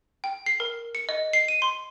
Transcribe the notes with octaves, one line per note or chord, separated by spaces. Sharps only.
G5
C7
A#4
C#7
D#5
C7
D#7
C6